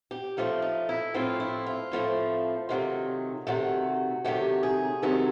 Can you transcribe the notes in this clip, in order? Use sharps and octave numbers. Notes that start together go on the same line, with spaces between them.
G4
A2 F3 A3 C4
D#4
E4
A2 F3 A3 C4 F4
E4
F4
A2 F3 A3 C4
C3 D#3 F#3 A3
C3 D#3 F#3 A3 F#4
C3 D#3 F#3 A3 G4
G#4
C3 D#3 F#3 A3 A4